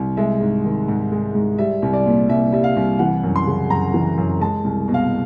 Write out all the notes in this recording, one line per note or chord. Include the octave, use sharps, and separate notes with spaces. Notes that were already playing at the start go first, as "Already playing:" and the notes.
Already playing: C2
G#3 E5
G#2
D#3
G#2
G#3
G#2
G3 E5
C2
D5
A#2
C2 E5
G3 E5
F5
C2
E3 F#5
F#2
C6
C#3
F#2 A#5
E3
F#2
G#3 A5
C2
B2
F5